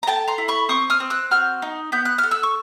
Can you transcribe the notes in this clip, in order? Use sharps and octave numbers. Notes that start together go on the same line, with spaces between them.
A#5
A4 G5 A5
A#5 C6
E4
B5 C#6
C4 C#6 D#6
D#6 F6
C4
E6 F#6
F#4 F6 G6
D#4
B3 G6
F#6
F6
A4
E6 F#6
C#6